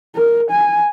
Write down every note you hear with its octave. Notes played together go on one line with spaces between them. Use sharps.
A#4
G#5